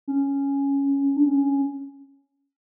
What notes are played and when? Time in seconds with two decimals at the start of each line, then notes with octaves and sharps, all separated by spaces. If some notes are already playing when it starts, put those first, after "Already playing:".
0.08 C#4
1.16 D4
1.26 C#4